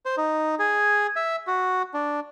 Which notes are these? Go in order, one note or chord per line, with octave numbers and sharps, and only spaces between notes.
C5
D#4
G#4
E5
F#4
D4